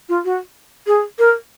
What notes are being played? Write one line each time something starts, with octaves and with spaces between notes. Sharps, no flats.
F4
F#4
G#4
A#4